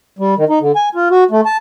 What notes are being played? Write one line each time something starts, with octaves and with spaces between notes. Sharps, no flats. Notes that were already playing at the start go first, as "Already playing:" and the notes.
G3
D#3
D#4
D3
G#5
F4
F#4
A3
A5